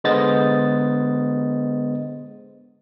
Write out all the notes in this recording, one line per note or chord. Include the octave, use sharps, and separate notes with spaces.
D3 G#3 B3 C5 D#5 A6